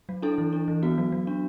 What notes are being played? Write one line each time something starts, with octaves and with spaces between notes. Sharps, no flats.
F#3
D4 E4 A4
E3
D4
E3
B3 F#4
F#3
F#3
D4